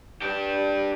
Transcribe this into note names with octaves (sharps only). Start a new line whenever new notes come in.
D4 G4